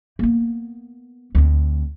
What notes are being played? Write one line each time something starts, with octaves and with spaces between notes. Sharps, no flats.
A#3 B3
D2 C4